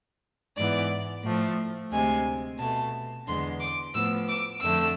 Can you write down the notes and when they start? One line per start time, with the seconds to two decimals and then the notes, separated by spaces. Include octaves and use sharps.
0.57 G#2 E3 B3 D5
1.24 A2 F3 A3
1.91 D2 C3 G#3 G#5
2.59 B2 A3 A5
3.27 E2 D3 G#3 B3 C6
3.60 D6
3.94 A2 F3 B3 E6
4.28 D6
4.62 F2 D3 A3 E6